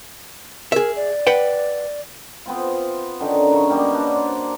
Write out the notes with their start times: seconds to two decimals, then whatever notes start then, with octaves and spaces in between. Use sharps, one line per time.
0.72 G#4 A#4 E5
0.96 D5
1.27 B4 F#5 G5
2.46 B3 C4 F4
3.20 D3 D#3 C#4 D#4
3.50 F#2 C#3 C#6
3.70 G3 A#3 B3
3.94 A#3 C#4 D4 F#4
4.15 C5 D5